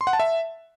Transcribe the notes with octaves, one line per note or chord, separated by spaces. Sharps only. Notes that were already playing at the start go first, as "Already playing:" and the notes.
C6
F#5
A5
E5